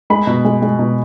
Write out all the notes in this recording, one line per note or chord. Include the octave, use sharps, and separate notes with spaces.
G#3 B5
B2
G#3
G#3
B2